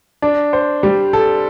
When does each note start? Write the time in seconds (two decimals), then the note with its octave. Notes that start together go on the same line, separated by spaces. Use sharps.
0.22 D4
0.53 C5
0.83 G3
1.13 A4